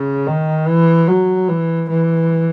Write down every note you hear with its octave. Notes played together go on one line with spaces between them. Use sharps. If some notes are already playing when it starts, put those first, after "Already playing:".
Already playing: C#3
D#3
E3
F#3
E3
E3